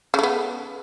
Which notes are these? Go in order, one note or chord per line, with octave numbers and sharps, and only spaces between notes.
C#3 A3 B3